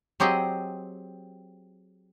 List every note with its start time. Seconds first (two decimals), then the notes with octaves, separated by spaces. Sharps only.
0.20 F#3 C4 G4 G#4 D#5